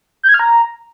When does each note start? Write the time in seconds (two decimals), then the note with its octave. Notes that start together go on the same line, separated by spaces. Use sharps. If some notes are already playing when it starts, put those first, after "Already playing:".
0.23 G6
0.29 G#6
0.34 F6
0.40 A#5